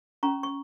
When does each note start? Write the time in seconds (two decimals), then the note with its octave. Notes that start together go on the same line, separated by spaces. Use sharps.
0.23 C#4 A#5 C#6
0.43 C#6